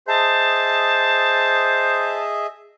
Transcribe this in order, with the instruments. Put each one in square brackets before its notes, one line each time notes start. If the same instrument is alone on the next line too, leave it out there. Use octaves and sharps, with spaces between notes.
[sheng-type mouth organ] G#4 D#5 E5 [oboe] C5 [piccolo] A5